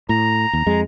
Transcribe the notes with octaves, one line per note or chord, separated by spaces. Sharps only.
A2 A#5
D#2
F2 G#3